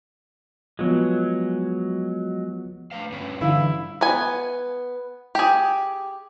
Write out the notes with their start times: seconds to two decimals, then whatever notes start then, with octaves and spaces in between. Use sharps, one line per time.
0.79 F3 F#3 G#3 B3 F4
2.91 A3 B4 F5
3.12 G2 C#4 B4
3.41 D3 E3 G3 E4 F5
4.01 B3 G#5
5.35 G4 G#4